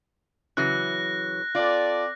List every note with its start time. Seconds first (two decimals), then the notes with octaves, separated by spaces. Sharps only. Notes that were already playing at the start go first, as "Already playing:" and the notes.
0.57 C#3 E3 F#3 F#6 A#6
1.55 C4 F4 A4 D5